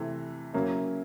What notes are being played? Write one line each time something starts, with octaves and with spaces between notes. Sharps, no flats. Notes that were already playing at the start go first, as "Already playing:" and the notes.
Already playing: C3 E3 A3
C#3 F#3 A#3 C#4 E4